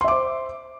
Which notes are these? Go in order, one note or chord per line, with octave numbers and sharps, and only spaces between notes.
C5 E5 C6 D6